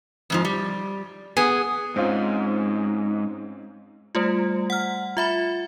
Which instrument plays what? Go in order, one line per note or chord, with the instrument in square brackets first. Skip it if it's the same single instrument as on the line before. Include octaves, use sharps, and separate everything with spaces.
[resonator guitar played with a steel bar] F2 G#2 F3
G3
[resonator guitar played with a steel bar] B3 [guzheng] G#4
[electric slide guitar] G#2 [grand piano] C4 C#4 F4
[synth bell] G3 A3 F4
F#5 F6
F4 E5 B5